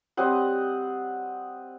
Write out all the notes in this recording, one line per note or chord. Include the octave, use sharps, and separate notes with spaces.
G3 C4 D#5 F#5